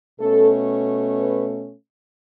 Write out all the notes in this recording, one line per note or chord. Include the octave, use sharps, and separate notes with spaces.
B2 A3 C#4 A4
B4